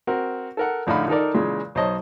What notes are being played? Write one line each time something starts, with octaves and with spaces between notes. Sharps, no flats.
C4 F#4 A#4
A4 A#4 F#5
A#1 A2 D3 D#4 F5 B5
D#3 D#4 A4 A#4 D5
A#2 C#3 E3 G#3
B1 C5 C#5 D#5 A5